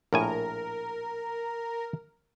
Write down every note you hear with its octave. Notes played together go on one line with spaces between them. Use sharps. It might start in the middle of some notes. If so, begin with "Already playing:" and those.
A#1 A2 A#4 G#5